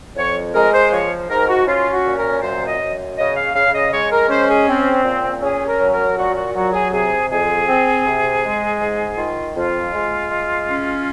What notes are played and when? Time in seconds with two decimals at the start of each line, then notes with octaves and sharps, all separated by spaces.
0.16 F2 C#5
0.54 G#3 A#4
0.73 C5
0.92 F3 C#5
1.29 G#2 A#4
1.48 F#4
1.66 C#4 F4
1.92 F#4
2.05 A#2
2.17 A#4
2.42 F#2 C5
2.67 D#5
2.80 F#2
3.17 C#3 D#5
3.36 F5
3.55 C#3 F5
3.74 D#5
3.92 G#3 C#5
4.11 A#4
4.29 C#4 C5
4.49 G#4
4.67 C4
5.04 A#2
5.42 C#4 G#4
5.67 A#4
5.80 F#3
5.92 A#4
6.17 A#2 F#4
6.36 F#4
6.55 F#3 F#4
6.73 G#4
6.92 C3 G#4
7.30 F2 G#4
7.67 C4
8.06 C3
8.43 G#3
8.80 G#2
9.17 D#3 F4
9.55 F2 F4
9.93 G#3
10.30 G#3
10.68 C#4